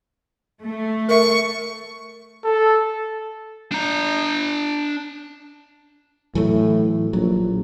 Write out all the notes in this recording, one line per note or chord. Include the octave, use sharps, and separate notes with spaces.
A3
A#4 E5 C#6
A4
D4 A#5
A2 E3 F#3 A3
A#1 F#3